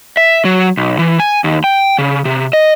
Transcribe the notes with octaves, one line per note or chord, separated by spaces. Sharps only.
E5
F#3
B1
E3
G#5
D#2
G5
C#3
C3
D#5